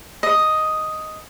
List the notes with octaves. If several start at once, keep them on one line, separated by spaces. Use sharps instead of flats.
D#5